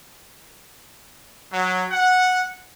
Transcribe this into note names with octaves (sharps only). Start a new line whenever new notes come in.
F#3
F#5